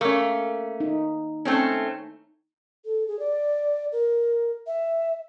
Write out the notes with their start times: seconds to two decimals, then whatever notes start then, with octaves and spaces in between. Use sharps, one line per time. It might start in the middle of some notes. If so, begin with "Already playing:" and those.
0.01 A3 A#3 C#4
0.80 D#4
1.45 A3 C4 C#4
2.85 A4
3.08 G#4
3.19 D5
3.92 A#4
4.67 E5